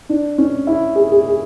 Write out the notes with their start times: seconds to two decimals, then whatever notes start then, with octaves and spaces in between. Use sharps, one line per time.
0.09 D4
0.38 C#4
0.67 E4
0.95 G#4
1.12 G#4
1.28 G#4